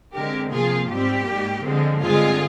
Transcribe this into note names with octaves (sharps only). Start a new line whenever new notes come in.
D3 G#3 C4 G4 A#4
C3 F3 A#3 F4 G#4
G#2 G3 C4 G4
G#2 G3 A#3
D3 F3 G#3 C4
G2 D3 G#3 C4 F4 G#4